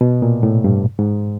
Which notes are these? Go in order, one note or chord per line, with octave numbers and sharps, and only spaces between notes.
B2
A#2
A2
G2
G#2